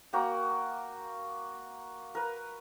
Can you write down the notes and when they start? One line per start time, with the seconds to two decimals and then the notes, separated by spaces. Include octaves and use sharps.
0.13 A#3 F#4 G5 A#5
2.15 A#4 B4